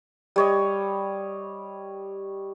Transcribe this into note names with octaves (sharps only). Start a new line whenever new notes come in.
G3 C#5 D#5